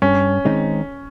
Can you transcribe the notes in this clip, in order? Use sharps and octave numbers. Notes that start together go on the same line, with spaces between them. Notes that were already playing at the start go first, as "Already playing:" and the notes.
G2 C#4
D#3 G#3 C4 D#4